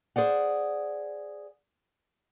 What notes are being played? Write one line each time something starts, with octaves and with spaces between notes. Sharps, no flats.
G#4 C5 D5 F#5